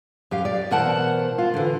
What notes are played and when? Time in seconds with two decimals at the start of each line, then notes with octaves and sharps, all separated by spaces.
0.31 F#2 G4 F5
0.45 D5
0.71 B2 E3 A#4 C5 F#5 A5
1.38 F4
1.54 D3 E3